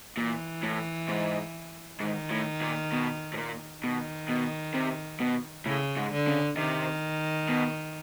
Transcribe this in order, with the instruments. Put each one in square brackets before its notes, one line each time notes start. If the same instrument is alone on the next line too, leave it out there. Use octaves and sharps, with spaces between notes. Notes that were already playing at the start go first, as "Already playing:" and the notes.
[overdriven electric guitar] A#2 [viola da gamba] E3
[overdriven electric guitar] A2
G#2
[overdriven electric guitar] G#2 [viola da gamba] D#3
[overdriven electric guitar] A2
A#2
B2
A2
A#2
[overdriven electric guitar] B2 [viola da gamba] D#3
[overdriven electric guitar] B2
C3
B2
[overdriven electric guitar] A2 [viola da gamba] C#3
[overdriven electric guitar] G#2
[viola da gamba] D3
[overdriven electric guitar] C#3
[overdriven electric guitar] C3 [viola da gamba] D#3
[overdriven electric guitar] B2